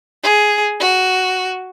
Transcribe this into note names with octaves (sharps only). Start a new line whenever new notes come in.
G#4
F#4